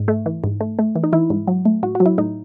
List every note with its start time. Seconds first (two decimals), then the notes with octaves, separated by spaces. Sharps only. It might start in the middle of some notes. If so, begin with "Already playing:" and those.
Already playing: G#2
0.08 A3
0.26 E3
0.44 G#2
0.61 A3
0.79 A3
0.96 E3
1.04 D#4
1.13 E3 E4
1.30 G#2
1.47 F#3
1.65 A3
1.83 A2 F#4
1.95 F#4
2.00 F#3
2.06 E4
2.18 A2 D#4